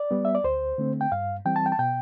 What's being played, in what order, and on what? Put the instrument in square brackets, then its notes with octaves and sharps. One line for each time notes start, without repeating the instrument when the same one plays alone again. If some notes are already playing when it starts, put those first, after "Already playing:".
Already playing: [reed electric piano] D5
G3 B3
E5
D5
D2 C5
D3 A3 C4
G5
G2 F5
E3 G3 C4 G5
A5
G5
A5
B2 G5